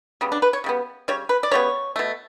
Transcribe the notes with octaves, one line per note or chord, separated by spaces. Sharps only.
C#3 G3 B3
D4
B4
C#5
C#3 G3 B3
C#3 G3 C#5
B4
D5
C#3 G3 B3 C#5
B2 A3